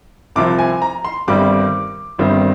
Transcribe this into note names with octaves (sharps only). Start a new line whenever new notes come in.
C2 C3 F3 C4 D6
G#5
A#5
C6
G1 G2 D#3 G3 C4 D6
G1 G2 D#3 G3 C4